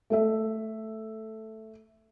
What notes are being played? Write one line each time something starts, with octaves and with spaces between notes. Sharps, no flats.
A3 A4 E5